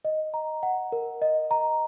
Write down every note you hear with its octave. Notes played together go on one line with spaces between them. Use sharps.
D#5
A#5
F#5
A#4
D#5
A#5